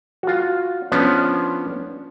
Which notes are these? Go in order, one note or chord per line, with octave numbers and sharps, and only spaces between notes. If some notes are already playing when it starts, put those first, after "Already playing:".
F4 F#4
F3 B3 C#4 D4